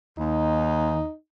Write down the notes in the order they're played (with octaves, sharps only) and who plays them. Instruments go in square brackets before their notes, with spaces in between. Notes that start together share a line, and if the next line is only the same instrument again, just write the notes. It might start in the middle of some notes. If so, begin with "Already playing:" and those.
[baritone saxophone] D#2 [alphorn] D#4